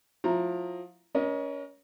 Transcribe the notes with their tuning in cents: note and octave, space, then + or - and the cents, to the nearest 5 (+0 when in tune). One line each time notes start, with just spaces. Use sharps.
F3 +30 E4 +30 A#5 +0
C#4 +25 A#4 +40 D#5 +0